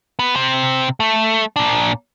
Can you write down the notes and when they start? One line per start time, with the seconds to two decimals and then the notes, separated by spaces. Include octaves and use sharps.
0.19 B3
0.36 C3 C4
1.00 A3
1.56 A#2 D4